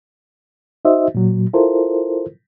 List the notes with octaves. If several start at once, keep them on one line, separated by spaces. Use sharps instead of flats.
D#4 F#4 C5 D#5 E5
A#2 F#3
E4 F4 A4 A#4 C5